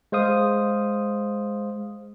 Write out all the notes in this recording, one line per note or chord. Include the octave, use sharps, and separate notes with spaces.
G#3 C5 F5 D#6